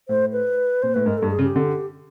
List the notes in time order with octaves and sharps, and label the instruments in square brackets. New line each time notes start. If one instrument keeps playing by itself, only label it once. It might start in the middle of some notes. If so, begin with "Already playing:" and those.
[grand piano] A2 [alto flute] C5
[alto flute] B4
[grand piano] A#2 [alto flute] C5
[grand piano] A2 [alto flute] B4
[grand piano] G#2 [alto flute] A#4
[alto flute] A4
[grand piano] G2
[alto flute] G#4
[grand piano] C#3
[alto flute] G4
[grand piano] D3